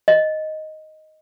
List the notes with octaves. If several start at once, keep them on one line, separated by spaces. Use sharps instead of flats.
D#5